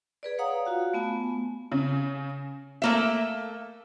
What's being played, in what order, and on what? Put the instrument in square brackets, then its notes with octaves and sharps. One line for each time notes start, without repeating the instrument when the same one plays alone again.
[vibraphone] G#4 B4 D5
C#5 F5 F#5 A#5 D#6
F4 F#4 F5
A3 B3 G#5
[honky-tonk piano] C#3
[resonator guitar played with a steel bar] A3 A#3 E5